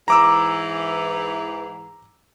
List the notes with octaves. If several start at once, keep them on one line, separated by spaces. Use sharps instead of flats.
G#2 E3 A#5 D6 E6